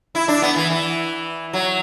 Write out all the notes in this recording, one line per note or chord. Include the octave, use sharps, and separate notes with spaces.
E4
D4
B3
E3
E3
F#3